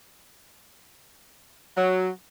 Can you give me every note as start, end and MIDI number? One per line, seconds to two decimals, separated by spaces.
1.77 2.08 54